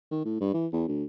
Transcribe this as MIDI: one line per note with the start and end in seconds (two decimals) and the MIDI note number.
0.11 0.23 51
0.25 0.39 45
0.40 0.53 43
0.54 0.66 52
0.72 0.84 40
0.88 1.04 38